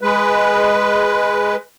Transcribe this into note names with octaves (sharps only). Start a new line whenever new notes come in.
G#3 B4